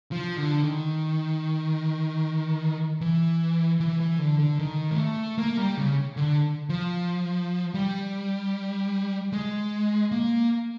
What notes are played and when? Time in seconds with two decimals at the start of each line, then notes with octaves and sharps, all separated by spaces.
0.12 F3
0.37 D3
0.64 D#3
3.01 E3
3.80 E3
4.00 E3
4.20 D3
4.39 D3
4.59 D#3
4.91 G#3
4.98 A3
5.38 A#3
5.57 G3
5.77 C#3
6.17 D3
6.69 F3
7.74 G3
9.33 G#3
10.12 A#3